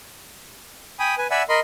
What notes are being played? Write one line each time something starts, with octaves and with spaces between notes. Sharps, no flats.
G5 G#5 B5 D#6
B4 G#5
D5 E5 F#5 G#5 B5 E6
A#4 D#5 B5 C6